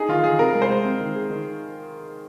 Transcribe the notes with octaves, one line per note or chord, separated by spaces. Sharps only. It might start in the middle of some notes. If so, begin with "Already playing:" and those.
Already playing: D#4 G#4
D#3 F4
D#3 G#4
C3 A#4
G#3
C5
G#3
C4
D#3
G#4
D#3